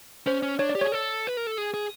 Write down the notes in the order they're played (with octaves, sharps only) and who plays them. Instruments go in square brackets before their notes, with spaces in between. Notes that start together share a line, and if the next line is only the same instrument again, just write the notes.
[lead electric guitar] C#4 [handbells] C5
[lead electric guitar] C#4
[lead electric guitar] D4 [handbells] C#5
[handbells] D5
[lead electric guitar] G4
[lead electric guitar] G#4 [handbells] C#5
[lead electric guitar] A4
B4
A#4
A4
G#4
G#4